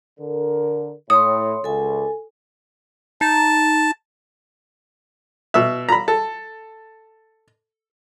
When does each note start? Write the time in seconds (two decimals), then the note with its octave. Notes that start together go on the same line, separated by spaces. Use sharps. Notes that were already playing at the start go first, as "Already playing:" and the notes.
0.20 D3 A#4
1.10 A2 C#5 C6 D#6
1.64 C#2 A4 G#5
3.21 D#4 A5
5.54 B2 E5
5.89 A#5 B5
6.08 A4